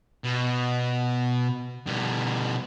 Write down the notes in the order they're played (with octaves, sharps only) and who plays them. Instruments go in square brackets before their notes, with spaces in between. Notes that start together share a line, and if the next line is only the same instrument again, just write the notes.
[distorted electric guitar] B2
B2 G3